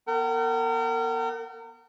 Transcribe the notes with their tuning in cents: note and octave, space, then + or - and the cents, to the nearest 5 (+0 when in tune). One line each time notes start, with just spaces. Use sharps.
B3 -30 A#4 -35 F#5 +45